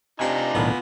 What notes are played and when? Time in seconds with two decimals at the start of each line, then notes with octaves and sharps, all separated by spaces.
0.20 C3 D4 D#4 F4 F5 G#5
0.55 B1 A2 D#3 B3